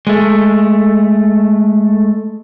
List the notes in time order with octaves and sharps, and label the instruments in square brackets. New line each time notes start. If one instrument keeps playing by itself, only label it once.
[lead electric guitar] G#3 A3